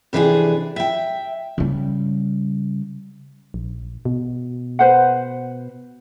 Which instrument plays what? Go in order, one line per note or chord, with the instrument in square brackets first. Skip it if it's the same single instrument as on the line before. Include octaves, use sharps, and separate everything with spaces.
[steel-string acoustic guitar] F2 C3 E3 D4 F4 G#4
E5 G5
[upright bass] C#3 G3
[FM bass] A#1
B2
[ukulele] B4 C5 F#5